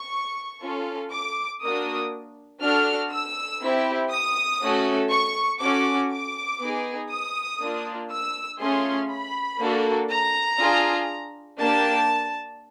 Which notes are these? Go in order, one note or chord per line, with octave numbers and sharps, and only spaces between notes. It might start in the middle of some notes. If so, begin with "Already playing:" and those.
Already playing: C#6
C#4 F4 A4
D6
A#3 D4 F#4 D#6
D4 F#4 A4 F6
E6
C4 E4 G4
D#6
A3 C#4 F#4 A4
C#6
C#4 F#4 A4 D6
D6
B3 D#4 G#4
D#6
A#3 D4 F4
E6
A3 C#4 F4 G#4 C6
B5
A#3 D4 F#4 A4
A#5
D4 F4 G#4
A#3 D4 G4 A5